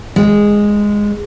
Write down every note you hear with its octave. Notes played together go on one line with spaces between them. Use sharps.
G#3